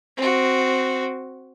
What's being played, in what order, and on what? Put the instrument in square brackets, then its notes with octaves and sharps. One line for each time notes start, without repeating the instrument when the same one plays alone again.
[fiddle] C4 F#4